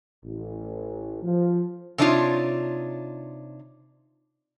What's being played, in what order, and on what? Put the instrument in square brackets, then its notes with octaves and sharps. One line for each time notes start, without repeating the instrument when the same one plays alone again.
[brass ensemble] A1
F3
[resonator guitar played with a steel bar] C3 D4 D#4 F4 C#5